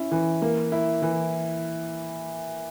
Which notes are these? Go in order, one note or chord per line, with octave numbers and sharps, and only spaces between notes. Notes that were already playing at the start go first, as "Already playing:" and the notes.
Already playing: C#4 E4
E3
A#3
E4
E3